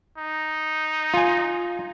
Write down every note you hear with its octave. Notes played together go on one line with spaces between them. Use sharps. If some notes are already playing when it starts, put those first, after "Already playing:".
D#4
F4 G#5